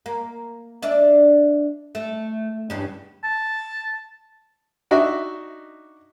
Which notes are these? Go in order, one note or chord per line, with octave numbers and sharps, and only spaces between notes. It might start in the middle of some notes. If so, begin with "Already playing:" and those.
A#3
D4 D5 E5
A3
E2 G2 C#3
A5
D4 D#4 F#4 D#5 E5